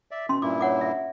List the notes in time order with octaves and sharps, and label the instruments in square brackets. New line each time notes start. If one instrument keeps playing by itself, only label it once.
[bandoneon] D5 E5
[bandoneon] B2 [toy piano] C#4 C6
[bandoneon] G2 A#2 E4 [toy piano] D6
[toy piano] C#5 F#5 D6
E5